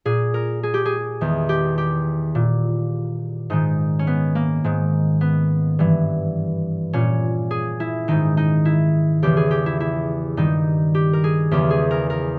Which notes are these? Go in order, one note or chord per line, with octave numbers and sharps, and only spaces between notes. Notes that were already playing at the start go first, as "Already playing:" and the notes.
A#2 G#4
A#4
G#4
G4
G#4
E2 D#3
G4
G4
A#2
G#2 D#3 D#4
C#4
B3
A#3
G#2 D#3
B3
G2 E3
A#2 C#4
G#4
E4
G#2 D#3 D#4
D#4
E4
E2 C#3 E3 G4
G#4
G4
E4
E4
G2 D#3 D#4
G4
A#4
G#4
E2 C#3 E3 G4
G#4
A#4
A#4